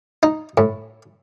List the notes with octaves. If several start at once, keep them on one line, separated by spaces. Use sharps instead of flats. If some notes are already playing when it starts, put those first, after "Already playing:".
D#4
A2